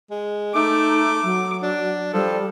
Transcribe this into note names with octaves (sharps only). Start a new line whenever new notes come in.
G#3
A3 D#4 D6
F#3
D4
F3 G3 A4